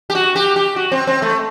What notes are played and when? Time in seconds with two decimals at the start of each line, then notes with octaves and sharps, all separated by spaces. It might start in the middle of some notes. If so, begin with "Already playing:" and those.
0.10 G4
0.15 F#4
0.36 G4
0.56 G4
0.76 F#4
0.92 C4
1.07 C4
1.22 A3